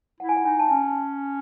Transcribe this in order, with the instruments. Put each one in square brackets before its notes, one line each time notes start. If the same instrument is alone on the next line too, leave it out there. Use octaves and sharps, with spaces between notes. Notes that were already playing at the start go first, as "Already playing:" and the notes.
[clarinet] E4 [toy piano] F#5
[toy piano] G#5
F#5
[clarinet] D#4 [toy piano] G#5
[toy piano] A5
[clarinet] C#4 [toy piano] G#5